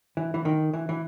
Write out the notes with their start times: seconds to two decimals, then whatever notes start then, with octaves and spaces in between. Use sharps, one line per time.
0.17 E3
0.34 E3
0.45 D#3
0.74 E3
0.89 E3